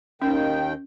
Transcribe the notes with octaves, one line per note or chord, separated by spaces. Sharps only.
D#2 D#3 C#4 G5